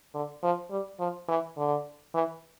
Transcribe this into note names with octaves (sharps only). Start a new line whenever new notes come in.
D3
F3
G3
F3
E3
D3
E3